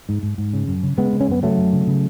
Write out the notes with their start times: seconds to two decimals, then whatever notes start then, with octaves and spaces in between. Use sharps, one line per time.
0.09 G#2
0.23 G#2
0.38 G#2
0.53 C#3
0.68 F#2
0.83 C#3
0.98 C#3 G#3 B3
1.13 C#3
1.20 C#4
1.28 F#2 B3
1.43 C#3 F#3 A3
1.58 F#2
1.73 C#3
1.87 C#3